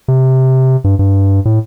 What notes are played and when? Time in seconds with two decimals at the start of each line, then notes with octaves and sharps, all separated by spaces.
0.08 C3
0.84 G2
0.99 G2
1.45 A2